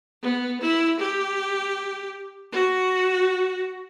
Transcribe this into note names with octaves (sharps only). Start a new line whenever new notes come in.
B3
E4
G4
F#4